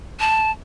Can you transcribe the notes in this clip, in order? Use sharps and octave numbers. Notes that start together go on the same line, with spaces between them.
A5